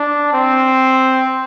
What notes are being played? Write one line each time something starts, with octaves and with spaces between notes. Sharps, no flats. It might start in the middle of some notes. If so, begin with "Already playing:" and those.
Already playing: D4
C4